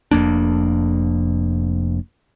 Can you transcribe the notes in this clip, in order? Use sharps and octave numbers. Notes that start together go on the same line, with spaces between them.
F1 F2 A#3 D4